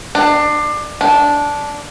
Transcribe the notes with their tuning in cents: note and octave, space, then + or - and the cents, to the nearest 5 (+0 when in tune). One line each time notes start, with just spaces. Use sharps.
D4 +25
D4 -10